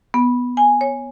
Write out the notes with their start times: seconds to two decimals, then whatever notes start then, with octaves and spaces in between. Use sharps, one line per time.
0.14 B3
0.57 G#5
0.81 C#5